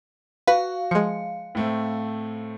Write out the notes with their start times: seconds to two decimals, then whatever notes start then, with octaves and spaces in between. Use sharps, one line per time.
0.47 F#4 B4 F5
0.91 F3 G#3 C#7
1.55 A2 A3 C4